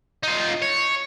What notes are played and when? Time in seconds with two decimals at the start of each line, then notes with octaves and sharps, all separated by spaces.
0.23 D#4 F4
0.62 C#5